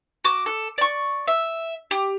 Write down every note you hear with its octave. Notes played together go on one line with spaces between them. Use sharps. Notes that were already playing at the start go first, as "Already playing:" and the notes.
F#4 D6 D#6
A4
D5 C#6
E5
G4